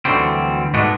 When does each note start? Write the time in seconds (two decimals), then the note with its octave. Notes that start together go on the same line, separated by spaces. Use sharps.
0.05 D2 D3 E3 F#3 G3 C4
0.74 G#2 B2 G#3 A3 B3 D4